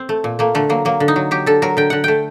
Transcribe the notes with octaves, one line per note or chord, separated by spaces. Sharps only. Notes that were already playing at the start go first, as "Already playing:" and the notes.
Already playing: C4
A3
A#2
A3 A#3
D3 A3
F#3 A#3
F#3 A#3
D3
D#4
F#3
F#3 G4
D3 A4
F#3 A#4
D3 G5
D3 F#5
A3 G5